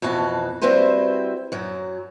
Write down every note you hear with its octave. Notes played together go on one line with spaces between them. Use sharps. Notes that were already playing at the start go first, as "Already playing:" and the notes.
F2 B2 E3 F#4 A5
G3 C4 E4 F#4 B4 C5
F#2 F#3